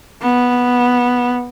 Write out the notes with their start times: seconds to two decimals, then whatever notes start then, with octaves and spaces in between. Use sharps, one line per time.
0.23 B3